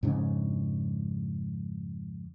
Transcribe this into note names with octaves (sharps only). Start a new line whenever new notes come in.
F2 G#2 C#3 D4